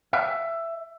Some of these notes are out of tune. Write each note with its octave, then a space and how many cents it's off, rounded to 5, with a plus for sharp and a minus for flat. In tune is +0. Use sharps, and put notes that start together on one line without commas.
E5 +15